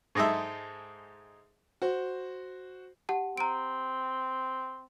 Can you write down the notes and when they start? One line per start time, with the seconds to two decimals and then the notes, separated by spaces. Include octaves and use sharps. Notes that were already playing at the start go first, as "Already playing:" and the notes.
0.15 G#2 G#3 D#4 A4 E5
1.82 F#4 C5
3.09 G4 F#5 A5
3.38 C4 A#5 D7